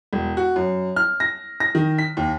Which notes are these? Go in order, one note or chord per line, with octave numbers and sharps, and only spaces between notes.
E1
F#4
F#2
F6
A#6
A#6
D#3
B6
D#2